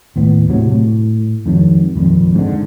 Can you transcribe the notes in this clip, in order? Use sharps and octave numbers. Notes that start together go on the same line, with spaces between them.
D#2 A2 B3
A2 C3 F#3
A2
F2 G#2 D#3 F#3
G#1 F2 A#2
G#2 D3